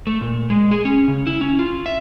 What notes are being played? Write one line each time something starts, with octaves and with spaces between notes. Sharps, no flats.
A3
A#2
G#3
G#4
C#4
C#3
E4
C#4
F4
E5